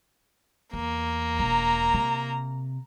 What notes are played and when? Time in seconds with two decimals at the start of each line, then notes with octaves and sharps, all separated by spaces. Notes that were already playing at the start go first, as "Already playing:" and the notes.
0.73 E2 A#3
1.39 E1 A#5
1.94 C3